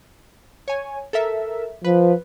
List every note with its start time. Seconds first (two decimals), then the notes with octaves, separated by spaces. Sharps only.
0.68 C#5 G#5
1.13 A4 A#4 E5
1.84 F3 B4